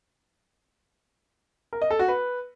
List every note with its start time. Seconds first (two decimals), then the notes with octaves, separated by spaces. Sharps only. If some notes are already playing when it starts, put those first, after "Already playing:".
1.73 A#4
1.82 D#5
1.91 A4
1.99 F#4
2.08 B4